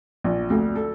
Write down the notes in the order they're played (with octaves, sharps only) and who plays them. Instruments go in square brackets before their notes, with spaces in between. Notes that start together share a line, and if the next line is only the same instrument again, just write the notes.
[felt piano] A#1
D2
A4